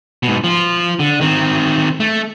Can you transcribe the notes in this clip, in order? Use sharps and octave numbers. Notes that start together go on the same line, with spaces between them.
G#2 B2
F3 F4
D3
D#3 C4
A3